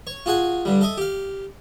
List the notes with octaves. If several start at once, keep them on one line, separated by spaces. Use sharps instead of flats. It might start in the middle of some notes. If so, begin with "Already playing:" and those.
C#5
F4 F#4 G#4 F#5 G#5
G2 D3 G3
A4 D#5 E5 D#6
G4 F5